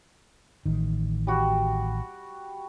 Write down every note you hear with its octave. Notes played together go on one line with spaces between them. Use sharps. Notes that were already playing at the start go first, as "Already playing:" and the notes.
A1 D#3
G3 F#4